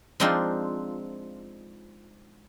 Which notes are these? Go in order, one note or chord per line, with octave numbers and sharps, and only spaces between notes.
F3 G#3 C4 D4 D#4 F4